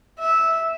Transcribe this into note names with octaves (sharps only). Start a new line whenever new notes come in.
E5